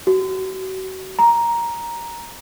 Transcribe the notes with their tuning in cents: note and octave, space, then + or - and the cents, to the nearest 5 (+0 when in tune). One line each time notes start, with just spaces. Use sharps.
F#4 +35
A#5 +5